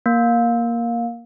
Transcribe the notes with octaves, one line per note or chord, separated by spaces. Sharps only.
A#3